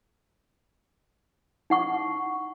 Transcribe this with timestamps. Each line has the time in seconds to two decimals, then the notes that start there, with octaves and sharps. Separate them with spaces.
1.70 D#4 F#5 C#6